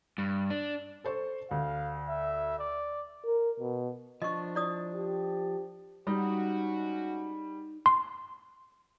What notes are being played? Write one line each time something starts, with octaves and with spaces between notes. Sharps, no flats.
G2
D4
A4 C5 C#6
D2 F5
E5
D5
A#4
B2
F3 D4 D#5 C#6
E4 D5 D#6
G4
G3 G#3 C#4 D#4 F#4
C6